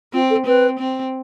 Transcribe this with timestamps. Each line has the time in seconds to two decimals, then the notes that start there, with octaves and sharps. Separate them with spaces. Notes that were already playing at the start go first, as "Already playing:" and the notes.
0.13 C4 F4
0.30 A4
0.46 C4 B4
0.79 C4